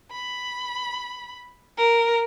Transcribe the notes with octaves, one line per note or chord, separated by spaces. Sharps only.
B5
A#4